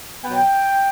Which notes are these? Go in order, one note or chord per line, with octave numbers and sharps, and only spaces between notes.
B2 F#3 B3 G5